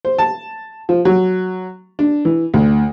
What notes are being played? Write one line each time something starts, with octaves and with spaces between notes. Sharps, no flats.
C5
A5
F3
F#3
D4
E3
D2